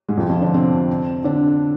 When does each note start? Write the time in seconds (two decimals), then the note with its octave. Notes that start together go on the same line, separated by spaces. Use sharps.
0.08 G#2 G#3
0.17 F2 F3
0.29 F2 F3
0.41 D3 D4
0.53 C3 C4
1.24 D3 D4